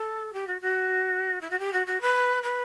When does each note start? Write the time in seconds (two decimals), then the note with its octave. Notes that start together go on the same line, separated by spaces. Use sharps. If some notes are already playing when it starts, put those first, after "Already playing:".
Already playing: A4
0.33 G4
0.47 F#4
0.61 F#4
1.41 E4
1.50 F#4
1.59 G4
1.73 F#4
1.86 F#4
2.01 B4
2.43 B4